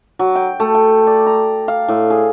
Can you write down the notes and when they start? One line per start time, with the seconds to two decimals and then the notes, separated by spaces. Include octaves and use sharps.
0.19 F#3
0.35 G5
0.60 A3
0.75 G5
1.07 D5
1.26 A#5
1.68 F5
1.88 A2
2.10 G#4